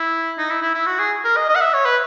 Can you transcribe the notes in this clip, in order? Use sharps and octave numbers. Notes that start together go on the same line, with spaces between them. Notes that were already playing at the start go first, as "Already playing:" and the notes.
Already playing: E4
D#4
E4
E4
E4
F#4
G#4
A#4
D#5
D#5
F#5
E5
C#5
B4